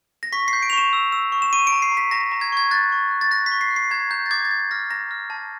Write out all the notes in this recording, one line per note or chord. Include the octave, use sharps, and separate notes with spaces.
A#6
C#6 B6
C7
G6
D7
F7
C#6 E7
E6
E6
C#6
E7
C#6 D#7
D7
A#5
C7
A#5
B6
A#5 A#6
A#5
G#6
C#6 G#6
F#6 A6
C#6
F#6
A6
F#6 A#6
B6
C#6
C7
F#6
C7
A#5 G#6
A#5 G6
A6
D6 G#6
A6
D6 G#6
F6 A#6
A#5 A#6
F6
A5